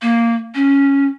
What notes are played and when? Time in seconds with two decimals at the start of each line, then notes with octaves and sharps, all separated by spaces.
0.02 A#3
0.55 C#4